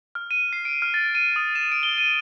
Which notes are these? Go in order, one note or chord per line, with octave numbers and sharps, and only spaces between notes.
F6
D#7
C7
D7
F6
A6
D#7
D#6
E7
D7
G7
D#7